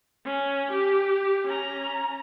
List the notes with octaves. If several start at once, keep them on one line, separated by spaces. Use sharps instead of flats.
C#4
G4
C#4 A#5